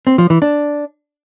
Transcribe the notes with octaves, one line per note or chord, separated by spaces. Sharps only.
C4
F3
E3
D4